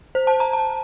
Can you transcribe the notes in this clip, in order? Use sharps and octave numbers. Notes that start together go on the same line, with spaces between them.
C5
A5
A#5
A5